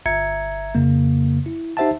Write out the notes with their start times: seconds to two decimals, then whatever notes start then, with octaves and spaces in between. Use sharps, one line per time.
0.06 G1 E5 A#5 G#6 C#7
0.75 F2 C#3 A#3
1.46 E4
1.77 D#4 G4 C5 E5 F#5 A5